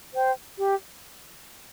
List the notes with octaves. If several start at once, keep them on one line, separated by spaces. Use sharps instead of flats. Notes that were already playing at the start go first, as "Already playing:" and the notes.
C5 G5
G4